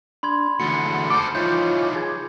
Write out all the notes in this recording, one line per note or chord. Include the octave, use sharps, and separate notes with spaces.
D4 B5 C6 G#6
E2 D3 A3 F#4 C#7
A4 C5 D6
E3 F3 D#4 F4 C#5 G6 A6
G#4 G#6 A6